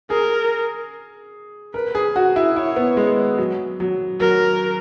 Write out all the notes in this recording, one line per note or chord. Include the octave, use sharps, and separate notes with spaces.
G#4 A#4
A#4 B4
G#4
F#4
E4
E4 C#5
B3
G#3
F#3
F#3
F#3 A#4